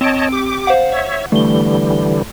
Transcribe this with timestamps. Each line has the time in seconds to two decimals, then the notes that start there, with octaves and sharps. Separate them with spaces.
0.01 C4 C#5 D#5 A5 D7
0.32 G4 D6
0.67 C5 F5 F#5
0.92 C#5 E5
1.32 D3 E3 G3 A3 G7